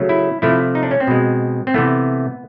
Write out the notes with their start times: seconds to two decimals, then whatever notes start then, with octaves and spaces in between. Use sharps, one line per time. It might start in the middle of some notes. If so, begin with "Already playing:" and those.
Already playing: C#3 F#3 A3
0.09 E4
0.42 C3 F3 A3 E4
0.75 D#4
0.83 D4
0.91 C#4
1.00 C4
1.07 B2 G#3
1.67 C4
1.74 C3 E3 A3 B3